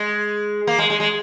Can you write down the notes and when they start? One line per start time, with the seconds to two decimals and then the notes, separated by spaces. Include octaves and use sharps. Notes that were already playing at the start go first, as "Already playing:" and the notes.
Already playing: G#3
0.67 A#3
0.79 G#3
0.90 G#3
1.00 G#3